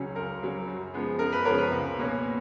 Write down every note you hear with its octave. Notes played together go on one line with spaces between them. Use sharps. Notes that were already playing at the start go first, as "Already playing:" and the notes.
Already playing: C#2 C#3 F#3 C#4
C#2 A#4
C#3 F#3 C#4
F#2
C#3 F3 G#3 B3
F#2 A#4
B4
C#3 F3 G#3 B3 A#4 C#5
B4
C#2
B2 A#3 C#4